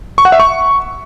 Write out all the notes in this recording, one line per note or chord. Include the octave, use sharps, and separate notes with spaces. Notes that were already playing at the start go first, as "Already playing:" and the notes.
C#6
F#5
E5
C#6